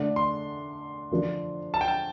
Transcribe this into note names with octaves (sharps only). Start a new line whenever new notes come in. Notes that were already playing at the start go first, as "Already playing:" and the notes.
Already playing: D3 A3 D4
C6
D3 F3 D4
A5
G5
A5